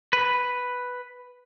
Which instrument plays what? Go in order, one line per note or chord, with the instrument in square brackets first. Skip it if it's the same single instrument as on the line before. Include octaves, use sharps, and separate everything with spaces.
[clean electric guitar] B4